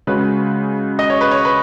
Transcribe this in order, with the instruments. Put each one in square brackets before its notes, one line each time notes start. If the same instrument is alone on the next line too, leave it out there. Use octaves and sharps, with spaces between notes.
[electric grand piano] C#3 G#3 C#4 F#4 [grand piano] B4
[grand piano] D#5
C#5
B4
C#5
B4